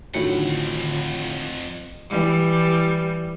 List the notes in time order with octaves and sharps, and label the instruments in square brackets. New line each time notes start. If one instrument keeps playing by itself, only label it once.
[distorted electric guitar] F2 F#5 [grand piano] A2 F#3 [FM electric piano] D3 D#3 [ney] F4
[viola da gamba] E3 G3